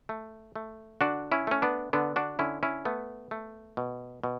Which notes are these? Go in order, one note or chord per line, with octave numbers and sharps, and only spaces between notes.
A3
A3
D3 D4 F#4
C#4 E4
A3 C#4
B3 D4
D3 B3 D4
D4 F#4
D3 C#4 E4
C#4 E4
A3 B3
A3
B2
B2